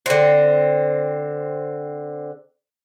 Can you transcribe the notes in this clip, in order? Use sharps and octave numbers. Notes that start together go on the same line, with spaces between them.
D3 C4